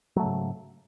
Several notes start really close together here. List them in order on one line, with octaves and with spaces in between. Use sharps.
F#3 A3 C#3 G#2